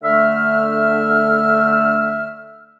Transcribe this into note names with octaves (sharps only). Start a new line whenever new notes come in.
D3 A3 E5 F6